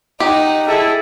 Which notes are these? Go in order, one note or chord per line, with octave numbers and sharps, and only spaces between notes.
D#4 G4 D#5 F#5
E4 G#4 A4